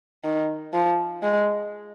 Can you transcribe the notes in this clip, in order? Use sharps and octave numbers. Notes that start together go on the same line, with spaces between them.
D#3
F3
G#3